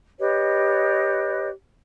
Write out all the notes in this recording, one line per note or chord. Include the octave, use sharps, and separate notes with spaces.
G4 B4 C#5 D#5